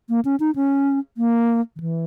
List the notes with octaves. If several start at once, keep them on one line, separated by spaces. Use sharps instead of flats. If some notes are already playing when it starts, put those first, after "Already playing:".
A#3
C#4
D#4
C#4
A#3
D#3
E3